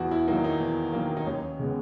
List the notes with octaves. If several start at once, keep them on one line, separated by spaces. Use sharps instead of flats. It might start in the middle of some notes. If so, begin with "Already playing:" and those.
Already playing: E2 F#4
E4
D#3 F#3 A#3 D#4
D#4
E2
D#3 F#3 A#3
D#4
D#2 C#4
C#3 G#3 B3